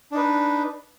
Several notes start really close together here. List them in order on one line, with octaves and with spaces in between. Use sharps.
D4 D#4 B4